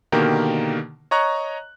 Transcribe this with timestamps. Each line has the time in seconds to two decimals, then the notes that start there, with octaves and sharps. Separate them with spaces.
0.12 B2 D3 D#3 A#3 G4 A#4
1.11 C#5 D#5 A#5 C#6 F#6